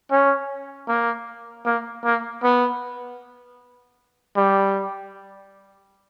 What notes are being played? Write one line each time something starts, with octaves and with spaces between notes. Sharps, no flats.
C#4
A#3
A#3
A#3
B3
G3